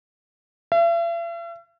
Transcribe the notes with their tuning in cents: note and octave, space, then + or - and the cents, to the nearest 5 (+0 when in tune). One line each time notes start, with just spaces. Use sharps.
E5 +45